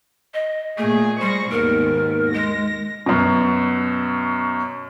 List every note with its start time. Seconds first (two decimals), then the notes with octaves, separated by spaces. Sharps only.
0.34 D#5
0.78 A#2 A3 G#4
1.21 G3 C5 C#6 A#6
1.51 D#2 G#2 B2 A#4
2.33 G#3 A#6
3.06 F#2 B2